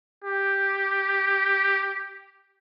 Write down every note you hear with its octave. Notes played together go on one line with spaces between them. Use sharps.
G4